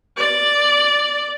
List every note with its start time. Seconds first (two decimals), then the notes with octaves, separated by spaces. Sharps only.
0.17 D5